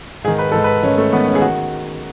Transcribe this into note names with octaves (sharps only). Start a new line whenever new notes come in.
G#2 D#3 G#4
B4
G#2 D#3 A4
B4
G#2 D#3 C#4
A3
G#2 D#3 B3
C#4
G#4
D#3 F#4